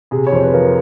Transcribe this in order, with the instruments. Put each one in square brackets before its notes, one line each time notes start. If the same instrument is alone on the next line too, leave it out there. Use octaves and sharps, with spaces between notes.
[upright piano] C3 G#4
C#5
F2 C5
B4
F3 A#4